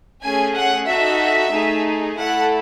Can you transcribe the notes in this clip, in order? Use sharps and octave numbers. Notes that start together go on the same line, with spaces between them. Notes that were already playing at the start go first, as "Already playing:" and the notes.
A3 C#4 G#4 G#5
F#5
D#4 F#4 A4 E5
A3 D#4 G#4
A3 E4 A4 F#5